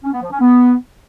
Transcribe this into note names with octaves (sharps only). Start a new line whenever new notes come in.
C#4
B3
F3
C#4
B3